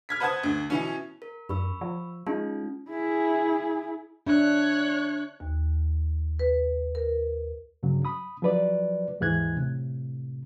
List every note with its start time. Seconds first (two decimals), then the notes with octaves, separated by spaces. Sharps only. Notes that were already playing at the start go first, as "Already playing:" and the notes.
0.09 F6 G#6 B6
0.20 B4 C5 F#5 A5 D#6 G#6
0.43 D2
0.70 B2 E3 C#4
1.22 A#4
1.49 F#2 B5 C#6 E6
1.81 F3
2.27 G#3 C#4 D#4 F4
2.89 E4 G#4
4.27 D4 C#5 E5 F#6
5.40 D#2
6.39 B4
6.95 A#4
7.83 G2 C#3 F#3
8.05 B5 D#6
8.42 F3 F#3 B4 D5
9.20 D#2 G#2 E3 F#6 G#6
9.56 A2 C3